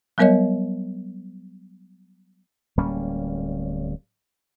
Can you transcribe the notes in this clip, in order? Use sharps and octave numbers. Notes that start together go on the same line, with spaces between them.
F#3 G3 B3 A#4 C#5 D#5
D1 G3 A#3 C#4